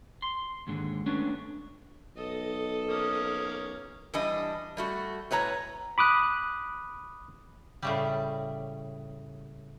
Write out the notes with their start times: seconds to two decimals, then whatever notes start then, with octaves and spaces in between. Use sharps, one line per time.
0.22 C6
0.67 D#2 G#2 D3
1.06 A3 B3 C#4 D4
2.17 B1 A4 D#5
2.89 A#3 C#4 D#6
4.14 E3 G3 D4 D#5
4.77 G3 A3 F#4
5.31 A2 B4 C#5 A#5
5.98 B5 D6 D#6 F#6
7.82 A2 C#3 G3